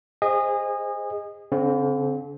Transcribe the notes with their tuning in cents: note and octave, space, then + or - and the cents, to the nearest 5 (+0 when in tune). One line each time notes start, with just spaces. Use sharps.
G#4 -30 C5 +0 D#5 +0
D3 -45 C4 +0